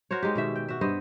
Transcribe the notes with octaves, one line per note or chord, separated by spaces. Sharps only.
F#4 A#4 C5 C#5
G#3 D#4 G4
B2 D#3 E5
G5
F#4 E5
G2 B3 C5 D#5